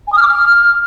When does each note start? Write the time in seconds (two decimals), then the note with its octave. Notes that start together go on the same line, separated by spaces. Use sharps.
0.07 G#5
0.12 D#6
0.17 F6
0.23 D6
0.28 F6